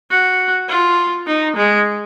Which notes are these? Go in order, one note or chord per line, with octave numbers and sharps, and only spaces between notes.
F#4
F4
D#4
G#3